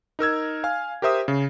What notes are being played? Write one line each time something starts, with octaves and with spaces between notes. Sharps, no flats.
D#4 A#4 E6 G#6
F5 G#5 F6
G4 A#4 C5 E5 D#6
C#3